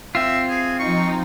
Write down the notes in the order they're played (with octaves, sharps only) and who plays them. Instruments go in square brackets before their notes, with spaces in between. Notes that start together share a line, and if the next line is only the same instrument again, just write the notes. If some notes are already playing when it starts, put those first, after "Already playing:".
[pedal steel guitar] C4 F4 [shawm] E5
[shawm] G#4
[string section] F3 D#4 [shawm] C#6